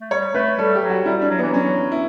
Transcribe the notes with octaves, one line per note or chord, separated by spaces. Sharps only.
A3
G3 C#5
A3 B4
G3 A4
G4
F#3
F#4
G3 E4
G3
D4
F#3
B3
E3
F#3 C#4
E4